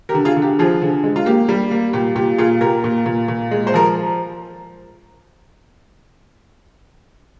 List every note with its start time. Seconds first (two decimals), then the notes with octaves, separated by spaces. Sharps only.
0.09 G4 A#4
0.14 D3
0.25 F4 G#4
0.37 D3
0.42 G4
0.59 F3 F4 G#4
0.82 D3
1.04 G#3
1.16 F4
1.26 A#3 G4
1.49 G3
1.71 A#3
1.93 A#2 G4
2.16 A#2 G4
2.38 A#2 F4 G#4
2.61 A#2 G4 A#4
2.84 A#2
3.06 A#2
3.28 A#2
3.51 G#3
3.67 C5
3.74 F3 A#4